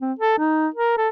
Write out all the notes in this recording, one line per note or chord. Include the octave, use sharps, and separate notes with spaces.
C4
A4
D#4
A#4
A4